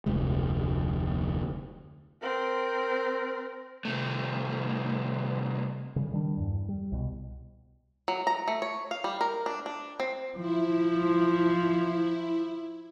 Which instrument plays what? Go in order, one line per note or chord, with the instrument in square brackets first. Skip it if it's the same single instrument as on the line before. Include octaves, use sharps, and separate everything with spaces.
[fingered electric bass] F1 D2 G#3
[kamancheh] C4 A#4
[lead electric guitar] C2 A3
[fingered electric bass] C#3 G3
D#3 G3 D4
E2 G2
G3
C2 B2
[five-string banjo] F#3
A#5
A3
C#5
F5
G3
A#4
D4
D4
C4
[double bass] F3 [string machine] E4